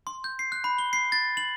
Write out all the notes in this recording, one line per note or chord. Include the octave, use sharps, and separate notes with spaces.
C6
G6
C7
F#6
B5
G7
C7
A6
F#7